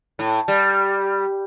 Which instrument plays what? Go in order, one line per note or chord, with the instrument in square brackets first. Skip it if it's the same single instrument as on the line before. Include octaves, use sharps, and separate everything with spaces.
[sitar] A2
G3